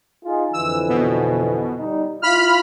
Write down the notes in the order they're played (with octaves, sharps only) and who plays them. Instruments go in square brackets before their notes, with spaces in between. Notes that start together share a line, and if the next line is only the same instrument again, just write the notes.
[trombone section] D#4 F4 G#4
[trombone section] F2 D3 E3 [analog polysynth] E6
[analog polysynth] B2
[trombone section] G3 D#4
[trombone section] E4 F4 [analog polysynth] B5 F6